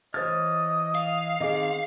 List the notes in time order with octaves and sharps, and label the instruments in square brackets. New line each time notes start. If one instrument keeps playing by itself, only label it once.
[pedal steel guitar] E3 C#5 F6 [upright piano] C5 A6 [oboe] D#5
[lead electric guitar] F5
[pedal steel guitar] D#3 C4 D6 [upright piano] G#4 D#5